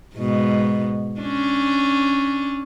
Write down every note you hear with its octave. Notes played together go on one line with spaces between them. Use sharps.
G#2 B2
C#4 D4